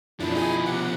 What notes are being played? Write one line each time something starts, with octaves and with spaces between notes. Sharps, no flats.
F#2 B2 F3 D4 E4
D#4 G#4 G#5
C3 F#5